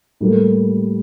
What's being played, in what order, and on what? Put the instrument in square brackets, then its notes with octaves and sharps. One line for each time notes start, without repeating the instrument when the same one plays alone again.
[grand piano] A2 G3 A#3